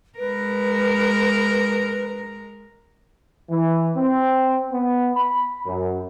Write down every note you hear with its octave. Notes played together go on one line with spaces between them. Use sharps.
G#3 A#4 B4
E3
C4
B3
B5
F#2